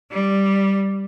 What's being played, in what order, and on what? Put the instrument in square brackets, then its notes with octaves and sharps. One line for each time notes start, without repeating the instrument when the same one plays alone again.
[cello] G3